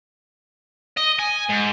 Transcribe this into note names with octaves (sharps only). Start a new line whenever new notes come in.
D#5
G#5
G#2